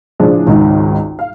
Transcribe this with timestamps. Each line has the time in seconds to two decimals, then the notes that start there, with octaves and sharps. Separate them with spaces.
0.20 A2 C#3 F3 D4 G#4
0.46 G#1 C#2 D#3
1.19 F5